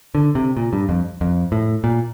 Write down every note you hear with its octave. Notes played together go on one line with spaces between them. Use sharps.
D3
C3
A#2
G2
F2
F2
A2
A#2